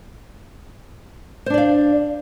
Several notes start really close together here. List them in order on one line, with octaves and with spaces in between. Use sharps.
C5 D4 D5 F5